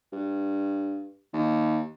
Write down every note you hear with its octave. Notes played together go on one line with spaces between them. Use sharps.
G2
D#2